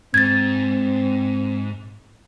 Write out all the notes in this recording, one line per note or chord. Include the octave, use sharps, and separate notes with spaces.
G#2 C4 G#6 A6